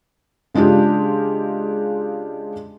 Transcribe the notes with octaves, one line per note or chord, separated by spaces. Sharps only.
C#3 G#3 D4 F4 G4